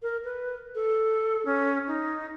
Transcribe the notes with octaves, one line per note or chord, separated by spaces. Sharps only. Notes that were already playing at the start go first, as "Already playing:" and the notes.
A#4
B4
A4
C#4
D#4